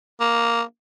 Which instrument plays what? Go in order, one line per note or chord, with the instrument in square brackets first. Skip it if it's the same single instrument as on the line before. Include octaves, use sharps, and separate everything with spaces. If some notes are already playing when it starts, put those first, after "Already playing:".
[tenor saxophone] A#3